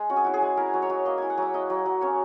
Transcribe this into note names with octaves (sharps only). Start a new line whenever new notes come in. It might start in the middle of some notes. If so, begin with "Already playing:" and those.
Already playing: G#3
C#4 F#4
G#4
E4 F#4
G#4
G#3
E4 A#4
F#3
C#5
F#3
A#3 D#5
E4 G#5
F#5
F#3 E5
E4 D#5
F#3
F#3
C#4 C#5